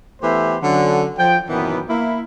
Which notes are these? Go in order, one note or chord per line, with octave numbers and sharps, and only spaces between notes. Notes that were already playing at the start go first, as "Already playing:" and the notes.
E3 A3 B3 G4 C5 E5
D3 F#3 C#4
F3 G5
F#2 A#2 D#3 E3 B3
A#3 E4